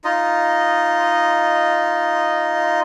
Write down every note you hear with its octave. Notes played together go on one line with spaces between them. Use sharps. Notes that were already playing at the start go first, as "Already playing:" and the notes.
D#4 F4 D#5